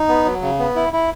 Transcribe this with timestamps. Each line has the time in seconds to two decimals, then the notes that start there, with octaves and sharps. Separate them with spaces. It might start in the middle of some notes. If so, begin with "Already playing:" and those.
Already playing: D#4
0.09 B3
0.25 F#3
0.42 C#3
0.59 B3
0.76 E4
0.93 E4